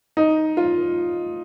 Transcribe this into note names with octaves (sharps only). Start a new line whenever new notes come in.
D#4
F4